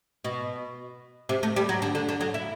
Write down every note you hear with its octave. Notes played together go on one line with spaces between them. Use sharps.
B2
C3
A3
G3
F#3
D3
D3
D3
F#3
E4